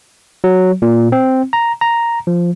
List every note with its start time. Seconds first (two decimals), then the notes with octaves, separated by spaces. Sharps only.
0.44 F#3
0.82 A#2
1.12 C4
1.53 A#5
1.81 A#5
2.27 F3